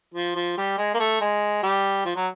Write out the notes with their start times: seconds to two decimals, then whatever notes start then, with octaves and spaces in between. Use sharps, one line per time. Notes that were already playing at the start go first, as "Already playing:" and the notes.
0.14 F3
0.35 F3
0.58 G3
0.78 G#3
0.94 A#3
0.99 A3
1.21 G#3
1.63 G3
2.05 F3
2.16 F#3